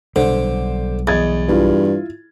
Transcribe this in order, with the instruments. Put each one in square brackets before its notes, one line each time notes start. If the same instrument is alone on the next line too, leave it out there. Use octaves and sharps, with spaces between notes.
[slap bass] B1 G3 [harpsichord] D3 [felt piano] C5
[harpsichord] E2 [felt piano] D#5 G#6 A6
[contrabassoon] G2 [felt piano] E4 F4